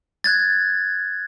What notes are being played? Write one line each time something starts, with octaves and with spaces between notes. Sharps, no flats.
F#6 G#6 A6